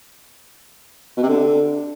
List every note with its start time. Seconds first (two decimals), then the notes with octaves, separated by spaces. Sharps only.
1.17 B2
1.23 C3
1.29 D3